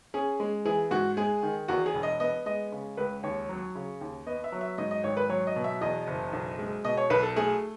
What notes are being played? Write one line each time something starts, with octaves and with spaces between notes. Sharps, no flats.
C#4 G#4
G#3
E3 G#4
G#2 F#4
G#3 G#4
D#3
E2 F#4
G#4
E1
D#5
B3 D#5
G#3 D#5
C#3
C#2 B4
D#2 C#5
F#3
C#3
D#2
B3 D#5
E5
F#3
E5
G#2 D#5
D#5
G#1 C#5
B4
F#3 C#5
D#5
B2
E5
E2 D#5
F#1
B1
G#3
B2 D#5
C#5
B1 B4
A4
A3 G#4